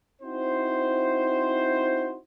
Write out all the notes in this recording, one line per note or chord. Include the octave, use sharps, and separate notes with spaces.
C4 D#4 E4 F#4 C5